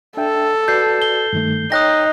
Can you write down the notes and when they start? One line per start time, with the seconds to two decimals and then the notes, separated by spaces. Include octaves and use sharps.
0.17 D4 A4 E5 G5
0.68 F#4 B4 D5 G6 C7
1.02 G7
1.33 G2 D#3 A3
1.72 D#4 C#5 D#5 G5 D#6 F#6 A#6